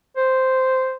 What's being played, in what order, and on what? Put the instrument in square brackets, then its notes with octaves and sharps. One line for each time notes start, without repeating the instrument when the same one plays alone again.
[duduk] C5